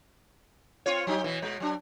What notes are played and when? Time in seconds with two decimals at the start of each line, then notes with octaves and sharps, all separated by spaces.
0.86 C4 F4 C#5
1.07 F#3 D#4 G4
1.24 B2 E3
1.42 B2 G#3
1.60 F#3 D4